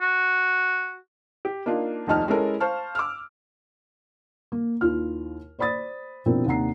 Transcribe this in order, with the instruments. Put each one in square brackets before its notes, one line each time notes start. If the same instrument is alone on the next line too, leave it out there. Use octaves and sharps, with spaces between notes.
[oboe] F#4
[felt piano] G4
A#3 D4 D#4 F4
F1 D#2 F3 D#4 A5 F6
G#3 C#4 E4 A4 A#4
C5 F5 A5 C#6 F6
D6 E6 F6
A#3
D#2 E4 F4 F6
C5 D5 B5 D#6 A6
B2 F3 C4 D4 E4 A#4
D#2 C3 D4 F#5 A#5 C7